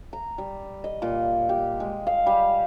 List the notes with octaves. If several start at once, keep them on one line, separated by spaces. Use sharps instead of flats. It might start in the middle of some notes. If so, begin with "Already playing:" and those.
A#5
G3
D#5
A#2
G4
G#3
F5
G3